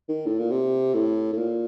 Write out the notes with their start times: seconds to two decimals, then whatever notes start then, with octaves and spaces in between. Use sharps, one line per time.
0.09 D#3
0.26 A2
0.39 A#2
0.51 C3
0.94 A2
1.33 A2
1.38 A#2